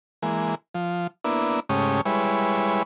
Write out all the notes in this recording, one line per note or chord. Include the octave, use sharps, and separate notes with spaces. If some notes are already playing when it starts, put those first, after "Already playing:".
E3 G#3 A#3
F3
A#3 B3 D4 E4
G#2 C#3 A3 C#4 G4 D#6
G3 G#3 E4 B4 C#5